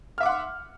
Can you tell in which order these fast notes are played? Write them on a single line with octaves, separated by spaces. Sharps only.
F6 E5 D6 F#5 C6